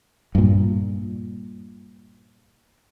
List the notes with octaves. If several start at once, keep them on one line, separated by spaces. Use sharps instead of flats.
G2 A#2